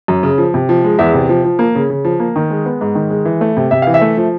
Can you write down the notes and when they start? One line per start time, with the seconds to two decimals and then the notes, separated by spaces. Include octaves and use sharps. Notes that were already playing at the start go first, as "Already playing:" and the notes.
0.08 F#2
0.23 C#3
0.38 F3
0.54 C3
0.69 F3
0.84 G#3
0.99 E2 E5
1.14 C3
1.29 F3
1.44 F3
1.59 A#3
1.75 C#3
1.90 C#3
2.05 F3
2.20 A#3
2.36 D#3
2.50 G#3
2.65 B3
2.81 G#2
2.95 D#3
3.10 G#3
3.25 E3
3.41 A3
3.57 C3
3.71 C3 E5
3.82 E3 F5
3.94 E5
4.01 A3
4.17 F3